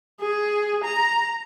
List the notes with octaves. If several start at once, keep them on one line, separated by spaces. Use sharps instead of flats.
G#4
A#5